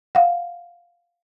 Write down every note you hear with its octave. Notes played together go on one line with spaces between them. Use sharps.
F5 F#5